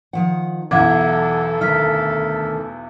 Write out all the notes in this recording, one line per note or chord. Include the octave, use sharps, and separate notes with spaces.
D#3 F3 F#5
B1 E2 E3 A4 E5 F#5 D6 G#6
D2 D#3 E5 F6 B6